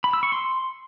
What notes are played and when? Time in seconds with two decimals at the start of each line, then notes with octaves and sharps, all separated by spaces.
0.04 B5
0.13 E6
0.23 C#6
0.32 C6